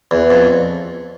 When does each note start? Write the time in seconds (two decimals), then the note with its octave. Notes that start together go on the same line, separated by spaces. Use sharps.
0.11 E2
0.30 F2